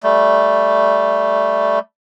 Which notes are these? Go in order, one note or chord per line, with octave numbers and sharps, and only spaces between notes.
G3 A3